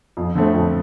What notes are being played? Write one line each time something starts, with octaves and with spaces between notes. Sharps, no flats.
F2
D3 A3 C4
F2